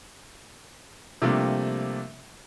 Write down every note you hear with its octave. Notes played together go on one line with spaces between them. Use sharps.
C3 F3 G3 A3 A#3 D4